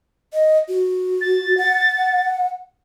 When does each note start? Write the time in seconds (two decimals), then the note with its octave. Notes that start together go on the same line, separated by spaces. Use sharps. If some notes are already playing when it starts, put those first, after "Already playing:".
0.33 D#5
0.69 F#4
1.21 A6
1.58 F#5